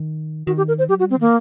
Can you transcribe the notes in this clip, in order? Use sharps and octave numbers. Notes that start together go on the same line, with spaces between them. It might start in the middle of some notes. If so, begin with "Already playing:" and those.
Already playing: D#3
D#3 F#4
G4
A#4
C5
F#3 G4
F#4
G3
C4
D#3 A#3